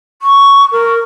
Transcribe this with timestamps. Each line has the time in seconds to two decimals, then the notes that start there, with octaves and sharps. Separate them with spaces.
0.22 C#6
0.72 A#4